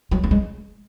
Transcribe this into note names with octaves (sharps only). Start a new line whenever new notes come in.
F#3
A#3
G#3